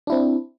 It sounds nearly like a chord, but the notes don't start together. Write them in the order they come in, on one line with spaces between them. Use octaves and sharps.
D4 E4 C4